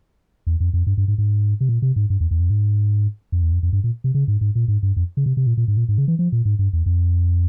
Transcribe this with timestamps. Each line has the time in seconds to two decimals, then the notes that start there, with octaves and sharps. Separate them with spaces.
0.47 E2
0.60 F2
0.74 F2
0.87 G2
0.98 G2
1.08 G#2
1.18 G#2
1.61 C3
1.69 A#2
1.82 C3
1.96 G#2
2.10 G2
2.21 E2
2.31 E2
2.40 F2
2.50 G#2
3.32 F2
3.42 E2
3.52 F2
3.63 F2
3.73 G2
3.84 A#2
4.04 C3
4.15 C#3
4.28 G#2
4.41 G#2
4.55 A#2
4.68 G#2
4.83 G2
4.97 F2
5.17 C#3
5.26 C3
5.37 C3
5.47 A#2
5.57 A#2
5.68 G#2
5.77 A#2
5.88 G#2
5.98 C#3
6.08 E3
6.19 F3
6.32 A#2
6.45 G#2
6.59 G2
6.73 E2
6.86 F2